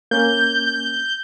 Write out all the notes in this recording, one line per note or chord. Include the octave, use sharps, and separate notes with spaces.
A#3 C#4 G6